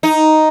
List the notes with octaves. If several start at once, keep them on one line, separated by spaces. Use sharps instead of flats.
D#4